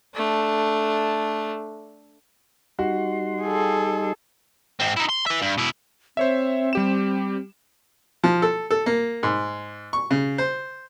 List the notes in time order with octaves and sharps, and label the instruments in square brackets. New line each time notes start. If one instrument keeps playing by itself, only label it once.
[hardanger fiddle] A3 D4
[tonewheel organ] G3 D#4 C6 [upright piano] F#4
[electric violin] G#4 A4
[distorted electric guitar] G#2 C4
D#4 E4
C6
B4 E5
G2
B2 E4
[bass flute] C4 [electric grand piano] C5 C#5 E5
[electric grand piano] G3 G4 E7
[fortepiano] F3
A4
A4
A#3
G#2
C#6
C#3
C5